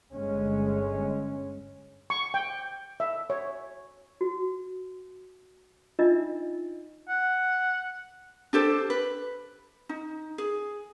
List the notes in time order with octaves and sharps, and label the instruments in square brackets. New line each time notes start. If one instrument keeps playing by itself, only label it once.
[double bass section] G1 G#3 C#4
[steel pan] C#6
G5
E5
C#5
[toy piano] F#4
D4 D#4 F4 D#5 E5 E6
[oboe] F#5
[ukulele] D4 G4 A4 C5
B4
D#4
G#4